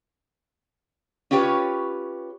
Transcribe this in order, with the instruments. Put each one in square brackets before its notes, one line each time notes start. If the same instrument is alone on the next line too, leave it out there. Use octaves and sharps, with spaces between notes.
[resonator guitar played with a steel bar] C#4 F4 G4 B4 C#5